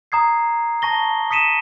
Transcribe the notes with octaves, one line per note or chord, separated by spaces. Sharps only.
A#5 D#6 G#6 C7
A5 C#6 A#6 G7
D#6 B6 C#7 D#7 E7